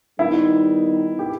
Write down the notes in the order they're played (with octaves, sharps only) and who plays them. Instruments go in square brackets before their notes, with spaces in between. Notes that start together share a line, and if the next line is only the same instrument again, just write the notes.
[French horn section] D#3 G3 B3 D#4 [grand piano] E4
[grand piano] G4